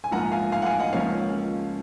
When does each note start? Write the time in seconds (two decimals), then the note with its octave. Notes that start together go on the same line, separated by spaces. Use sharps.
0.04 G#5
0.11 A#1 G#2 F3 A#3 F#5 A#5
0.32 F5 G#5
0.52 F5 G#5
0.62 F#5
0.65 F5 G#5
0.80 D#5 F#5
0.93 C#2 C#3 F3 A#3 C#4 C#5 F5